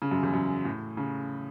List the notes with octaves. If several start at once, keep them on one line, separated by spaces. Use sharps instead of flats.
C#3
F#2
E2
F#2
A2
C#3